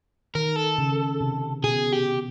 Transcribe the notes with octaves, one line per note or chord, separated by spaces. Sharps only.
D#3 A#4
A4
C#3
C3
B2 G#4
G4